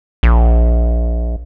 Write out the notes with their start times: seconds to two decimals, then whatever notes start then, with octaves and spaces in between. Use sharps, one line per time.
0.23 A#1